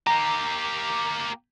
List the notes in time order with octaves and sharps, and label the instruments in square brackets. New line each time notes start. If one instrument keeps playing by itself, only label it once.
[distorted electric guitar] A#3 G4 [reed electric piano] A#5